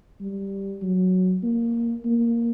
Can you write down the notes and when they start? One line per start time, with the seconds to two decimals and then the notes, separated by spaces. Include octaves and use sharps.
0.21 G3
0.82 F#3
1.43 A#3
2.05 A#3